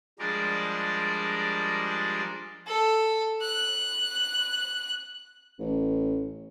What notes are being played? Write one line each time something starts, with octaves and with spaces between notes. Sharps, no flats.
F3 G3 G#3 D4 A#4 D5
A4
F#6
A1